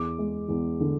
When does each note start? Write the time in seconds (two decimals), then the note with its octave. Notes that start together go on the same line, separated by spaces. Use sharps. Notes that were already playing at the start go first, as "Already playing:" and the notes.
Already playing: E2 D6
0.18 G#3
0.49 E2
0.80 D3